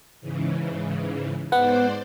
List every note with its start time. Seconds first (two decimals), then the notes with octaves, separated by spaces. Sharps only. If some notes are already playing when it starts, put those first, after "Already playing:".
0.21 G#2 C#3 E3
1.52 G#2 B3 C5 D5 F#5